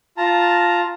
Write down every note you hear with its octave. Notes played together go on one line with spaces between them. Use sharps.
F4 A5 A#5